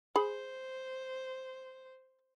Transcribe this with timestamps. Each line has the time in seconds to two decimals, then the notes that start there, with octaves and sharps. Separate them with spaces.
0.16 G#4 C5 B5